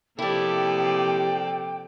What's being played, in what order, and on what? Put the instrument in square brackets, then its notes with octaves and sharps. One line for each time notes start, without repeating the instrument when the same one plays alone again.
[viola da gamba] C3 F3 A#3 [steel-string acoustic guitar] E4 G4 [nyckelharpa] A4 D5 [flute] G5